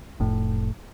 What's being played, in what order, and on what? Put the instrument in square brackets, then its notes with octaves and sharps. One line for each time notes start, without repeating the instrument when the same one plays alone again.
[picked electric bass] F1 A2